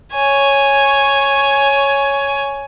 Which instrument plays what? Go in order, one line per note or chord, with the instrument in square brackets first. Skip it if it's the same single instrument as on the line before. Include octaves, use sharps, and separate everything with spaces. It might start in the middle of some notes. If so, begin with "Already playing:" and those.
[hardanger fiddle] C#5 G#5